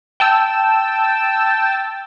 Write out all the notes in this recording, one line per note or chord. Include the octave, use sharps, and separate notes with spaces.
G5 A5 E6